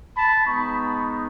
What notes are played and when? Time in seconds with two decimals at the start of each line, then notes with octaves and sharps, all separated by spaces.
0.16 A5 B5
0.46 G#3 B3 D#4 B5 C#6